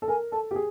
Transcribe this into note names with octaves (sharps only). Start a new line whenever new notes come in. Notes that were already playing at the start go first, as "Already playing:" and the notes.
A4
A#4 G#5
A4 A5
G4
G#4